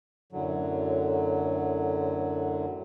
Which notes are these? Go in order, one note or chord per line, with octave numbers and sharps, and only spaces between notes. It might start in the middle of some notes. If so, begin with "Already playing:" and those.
F#2 A2 D3 F#3